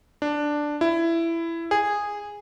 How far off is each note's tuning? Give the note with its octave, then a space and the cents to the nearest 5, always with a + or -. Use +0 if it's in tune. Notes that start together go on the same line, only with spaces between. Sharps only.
D4 +5
E4 +15
G#4 -10